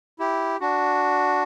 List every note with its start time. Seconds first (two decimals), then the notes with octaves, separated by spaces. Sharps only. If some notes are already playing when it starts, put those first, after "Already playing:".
0.19 E4 G4
0.60 D4 F#4